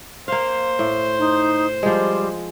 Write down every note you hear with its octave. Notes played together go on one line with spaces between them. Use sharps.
A#3 C5 F5
A2
D#4
F3 G3 G#3